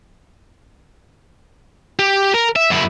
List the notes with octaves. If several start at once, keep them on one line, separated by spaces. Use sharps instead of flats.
G4
A#4
E5
F#2 E4